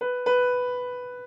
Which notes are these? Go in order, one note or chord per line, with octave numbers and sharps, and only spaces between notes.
B4
B4